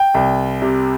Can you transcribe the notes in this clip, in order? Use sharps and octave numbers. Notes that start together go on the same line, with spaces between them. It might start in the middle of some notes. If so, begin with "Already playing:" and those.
Already playing: G5
C2
C3